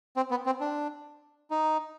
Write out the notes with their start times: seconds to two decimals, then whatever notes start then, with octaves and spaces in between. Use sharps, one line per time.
0.16 C4
0.31 B3
0.46 C4
0.61 D4
1.51 D#4